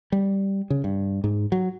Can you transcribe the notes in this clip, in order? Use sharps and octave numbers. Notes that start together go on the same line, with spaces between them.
G3
C#3
G2
G#2
F#3